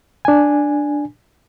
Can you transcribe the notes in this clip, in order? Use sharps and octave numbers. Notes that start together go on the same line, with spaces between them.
D4 G#5